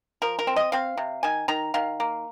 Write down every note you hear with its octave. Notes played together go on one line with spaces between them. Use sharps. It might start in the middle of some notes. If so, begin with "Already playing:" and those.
F3 A#4
A#4
C4
D#5
C4 F5
C3
D#3 G#5
D#3 A#5
D#3 F5
A#3